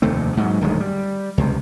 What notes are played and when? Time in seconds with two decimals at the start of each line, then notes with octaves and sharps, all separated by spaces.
0.02 F1 D#2 A3 C4
0.37 G#2 F#3
0.61 D1 G2 D#3 G#3
0.80 G3
1.38 C#2 C3